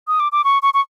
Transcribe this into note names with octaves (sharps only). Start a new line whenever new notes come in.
D#6
D6
D6
C#6
C#6
C#6